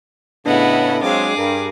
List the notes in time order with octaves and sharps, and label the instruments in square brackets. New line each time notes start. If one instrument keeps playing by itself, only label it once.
[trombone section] A2 C#3 [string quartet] B3 E4 [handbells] D4 [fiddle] D#5 F#5
[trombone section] F#3 G#3 C4 [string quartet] G#4 D6 [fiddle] F5
[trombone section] G2 [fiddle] A#4